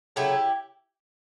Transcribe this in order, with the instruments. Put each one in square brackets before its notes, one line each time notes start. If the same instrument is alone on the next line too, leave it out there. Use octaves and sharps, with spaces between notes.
[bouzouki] C#3 F#3 A3 E4 G4